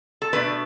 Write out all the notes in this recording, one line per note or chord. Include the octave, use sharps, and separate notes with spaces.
A4
B2 A3 D4 B4